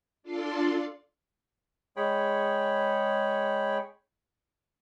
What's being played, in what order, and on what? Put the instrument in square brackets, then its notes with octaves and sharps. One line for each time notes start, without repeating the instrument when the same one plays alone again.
[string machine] D4 F4 A4 D5 C6
[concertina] G#3 G#4 C#5 G5 B5